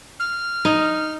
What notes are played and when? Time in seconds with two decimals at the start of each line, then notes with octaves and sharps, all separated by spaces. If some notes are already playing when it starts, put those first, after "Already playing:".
0.20 F6
0.65 D#4